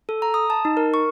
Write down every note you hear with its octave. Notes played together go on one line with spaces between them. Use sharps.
A4
A#5
D#6
A5
D#4
A#4
C#6